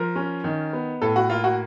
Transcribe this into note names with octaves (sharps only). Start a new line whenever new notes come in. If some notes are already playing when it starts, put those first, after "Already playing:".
Already playing: F3 A#4
C#4
D#3
B3
A2 A4
F#4
A#3 F4
F#4